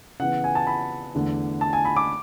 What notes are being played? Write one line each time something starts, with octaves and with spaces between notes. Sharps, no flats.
C#3 E3 B3 F#5
G#5
A5
B5
E2 D3 A3
A5
G#5
B5
D6